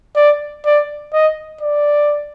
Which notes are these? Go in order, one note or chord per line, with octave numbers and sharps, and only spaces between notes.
D5
D5
D#5
D5